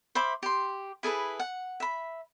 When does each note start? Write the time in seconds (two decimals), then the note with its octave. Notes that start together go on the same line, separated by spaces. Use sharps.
0.15 C5 E5 B5 D6
0.43 G4 C6
1.03 E4 G#4 A4 B4
1.40 F#5
1.80 E5 B5